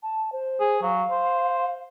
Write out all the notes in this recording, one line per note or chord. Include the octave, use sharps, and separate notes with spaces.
A5
C5
G#4
F#3 F5
C5